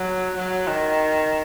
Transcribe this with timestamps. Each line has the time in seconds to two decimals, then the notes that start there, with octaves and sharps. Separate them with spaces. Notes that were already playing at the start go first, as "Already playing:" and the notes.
Already playing: F#3
0.36 F#3
0.67 D#3